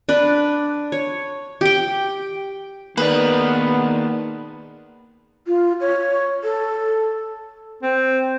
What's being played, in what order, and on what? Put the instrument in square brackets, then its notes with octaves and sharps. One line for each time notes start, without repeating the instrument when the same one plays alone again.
[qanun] D4 B4
C#5
G4 G5
[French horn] D#3 [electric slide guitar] A#3 G#4 D5 [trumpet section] B3 [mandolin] B4
[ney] F4
C#5
A4
[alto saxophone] C4